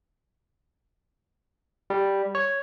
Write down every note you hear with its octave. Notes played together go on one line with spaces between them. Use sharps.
G3
C#5